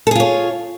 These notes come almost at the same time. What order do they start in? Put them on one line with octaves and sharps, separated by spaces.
A4 G#4 F4 C#5